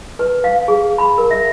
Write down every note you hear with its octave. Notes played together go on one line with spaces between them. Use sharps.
B4
F5
G#4
B5
A#4
E5